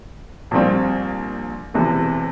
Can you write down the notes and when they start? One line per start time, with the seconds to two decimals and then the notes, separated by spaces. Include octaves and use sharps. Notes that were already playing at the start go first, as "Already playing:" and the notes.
0.51 A#1 A#2 G3 C4
1.74 E1 E2 C3 E3